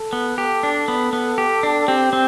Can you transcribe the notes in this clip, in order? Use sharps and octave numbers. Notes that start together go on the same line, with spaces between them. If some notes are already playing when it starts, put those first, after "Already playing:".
Already playing: A4
B3
G4 A4
D4
B3
B3
G4
D4
C4 G4
C4